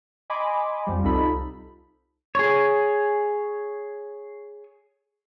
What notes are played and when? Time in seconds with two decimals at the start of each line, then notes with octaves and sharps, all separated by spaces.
0.30 D#5 G#5 B5 C6 D6
0.87 F2 F3 G3
1.03 C2 D#4 F4 A4 B5
2.35 G#4 C#5